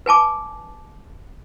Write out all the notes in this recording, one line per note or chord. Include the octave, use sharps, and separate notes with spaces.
B4 G#5 A5 D6